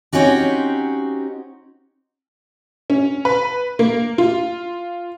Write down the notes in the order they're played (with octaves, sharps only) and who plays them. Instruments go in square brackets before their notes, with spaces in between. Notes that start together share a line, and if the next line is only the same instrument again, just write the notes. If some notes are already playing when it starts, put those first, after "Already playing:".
[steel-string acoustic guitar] C4 C#4 D#4 F#4 G4
[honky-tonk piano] C#4
B4
A#3
F4